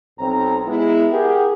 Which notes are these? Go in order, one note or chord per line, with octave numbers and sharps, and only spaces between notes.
B1 C4 A#5
G#3 B3 E4
G4 G#4 A#4 F#5